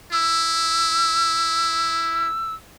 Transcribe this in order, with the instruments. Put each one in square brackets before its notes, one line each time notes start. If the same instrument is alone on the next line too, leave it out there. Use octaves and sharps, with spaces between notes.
[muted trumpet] E4 [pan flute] E6